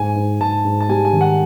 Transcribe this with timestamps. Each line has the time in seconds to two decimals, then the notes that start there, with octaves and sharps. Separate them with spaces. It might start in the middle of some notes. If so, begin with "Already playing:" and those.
Already playing: G#2 G#5
0.16 G#2
0.40 G#2 A5
0.65 G#2
0.80 A5
0.89 G3 G#5
1.05 G#5
1.13 D#3
1.21 F#5